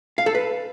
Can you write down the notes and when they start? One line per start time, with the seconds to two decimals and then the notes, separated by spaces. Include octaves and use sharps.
0.18 F5
0.26 A4
0.35 B4